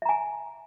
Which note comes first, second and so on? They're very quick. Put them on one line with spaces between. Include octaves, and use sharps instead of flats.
E5 A#5 G#5